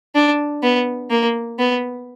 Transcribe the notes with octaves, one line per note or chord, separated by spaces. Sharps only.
D4
B3
A#3
B3